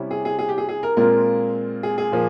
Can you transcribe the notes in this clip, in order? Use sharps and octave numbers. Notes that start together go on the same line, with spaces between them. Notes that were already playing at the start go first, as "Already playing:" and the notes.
Already playing: C3 G3 C#4 E4
G#4
G#4
G#4
G4
G#4
G#4
A#4
A#2 G#3 C4 F4 A#4
G#4
G#4
A#2 F3 A#3